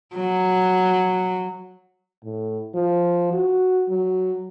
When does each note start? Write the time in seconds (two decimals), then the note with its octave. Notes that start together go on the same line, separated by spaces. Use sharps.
0.15 F#3
2.24 A2
2.75 F3
3.33 F#4
3.89 F#3